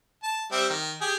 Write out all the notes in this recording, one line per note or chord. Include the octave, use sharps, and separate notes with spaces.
A5
G3 C4 E5
D#3
G4 G#4